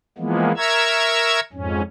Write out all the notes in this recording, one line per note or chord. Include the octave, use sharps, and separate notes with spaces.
E3 F3 G#3 A#3 B3
A#4 E5 A#5 C#6 E6 G#6
F2 G#2 C#4